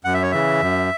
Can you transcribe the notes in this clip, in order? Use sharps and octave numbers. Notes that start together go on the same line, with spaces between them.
F#2 F#5
E5
C#5
C#3 E3 E5
F#2